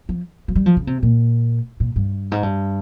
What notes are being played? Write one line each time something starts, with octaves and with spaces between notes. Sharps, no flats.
F3
F3
G3
F3
C#3
C3
A#2
A#2
G2
G#2
G2